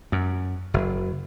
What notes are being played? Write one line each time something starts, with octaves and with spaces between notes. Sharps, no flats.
F#2
F#1